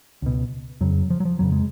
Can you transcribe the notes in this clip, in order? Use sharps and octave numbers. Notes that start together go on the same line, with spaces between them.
C#2 B2
F2 C#3 F#3
F3
F#3
F3
F2 C#3 F#3
G#3